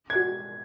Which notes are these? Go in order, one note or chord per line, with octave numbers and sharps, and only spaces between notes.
G#6
F#4